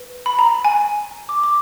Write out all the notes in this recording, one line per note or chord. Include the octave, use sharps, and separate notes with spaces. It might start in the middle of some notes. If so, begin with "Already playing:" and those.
Already playing: B4
B5
A#5
G#5
D6
D6